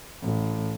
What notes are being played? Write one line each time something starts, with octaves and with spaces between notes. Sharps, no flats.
A1